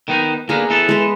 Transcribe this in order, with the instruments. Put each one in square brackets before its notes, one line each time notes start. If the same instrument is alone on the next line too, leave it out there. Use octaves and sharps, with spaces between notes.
[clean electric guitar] D#3 B3 D#4
[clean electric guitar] D3 A#3 B3 [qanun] G#4 A#5
[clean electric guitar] E3 B3 A4
[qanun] G#3 B4